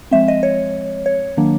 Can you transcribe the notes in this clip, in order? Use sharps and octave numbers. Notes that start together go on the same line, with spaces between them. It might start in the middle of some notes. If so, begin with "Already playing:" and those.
F3 G#3 C4 E5
D#5
C#5
C#5
D#3 F#3 A#3 D4